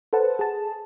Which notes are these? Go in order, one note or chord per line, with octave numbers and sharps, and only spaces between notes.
A4 B4 C5 F#5 A5
G#4 A5